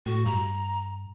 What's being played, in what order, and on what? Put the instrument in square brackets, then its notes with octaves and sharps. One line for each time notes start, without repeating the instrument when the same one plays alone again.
[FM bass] A2 [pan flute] F#4
[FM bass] G2 [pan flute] A#5